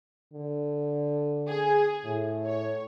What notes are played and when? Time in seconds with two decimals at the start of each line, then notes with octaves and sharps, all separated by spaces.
0.34 D3
1.48 G#4
2.05 A2
2.45 C#5